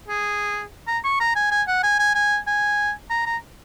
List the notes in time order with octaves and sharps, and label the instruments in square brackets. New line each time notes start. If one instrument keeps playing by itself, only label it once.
[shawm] G#4
A#5
C#6
A#5
G#5
G#5
F#5
G#5
G#5
G#5
G#5
A#5
A#5